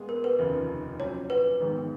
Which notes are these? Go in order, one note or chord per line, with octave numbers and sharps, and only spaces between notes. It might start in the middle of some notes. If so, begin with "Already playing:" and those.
Already playing: A#2 G#3 B3 F4 G#4
A#4
B4
F1 D#2 C#3 F3
A#2 F#3 C#4 C#5
B4
G#1 G#2 D#3 G#3 B3